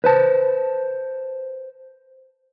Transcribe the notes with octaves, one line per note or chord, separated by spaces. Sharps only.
B4 C5 A5